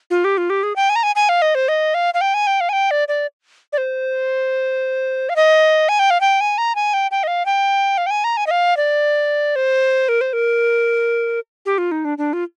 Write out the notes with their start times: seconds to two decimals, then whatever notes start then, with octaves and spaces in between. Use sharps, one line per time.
0.11 F4
0.24 G4
0.38 F4
0.50 G4
0.63 G#4
0.76 G5
0.89 G#5
0.96 A#5
1.03 G#5
1.16 G#5
1.29 F5
1.42 D#5
1.55 C5
1.68 D#5
1.94 F5
2.14 F5
2.21 G5
2.34 G#5
2.47 G5
2.60 F5
2.69 G#5
2.73 G5
2.91 D5
3.08 D5
3.73 D5
3.78 C5
5.29 F5
5.36 D#5
5.89 G#5
5.99 G5
6.10 F5
6.21 G5
6.41 G#5
6.58 A#5
6.75 G#5
6.94 G5
7.11 G5
7.23 D#5
7.27 F5
7.46 G5
7.98 F5
8.06 G5
8.11 G#5
8.24 A#5
8.37 G#5
8.47 D#5
8.51 F5
8.77 D5
9.56 C5
10.09 A#4
10.21 C5
10.33 A#4
11.66 G4
11.78 F4
11.91 D#4
12.05 D4
12.18 D4
12.33 F4